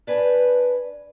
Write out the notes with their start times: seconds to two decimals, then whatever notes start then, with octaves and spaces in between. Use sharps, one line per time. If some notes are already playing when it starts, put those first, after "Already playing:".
0.07 D4 B4 G#5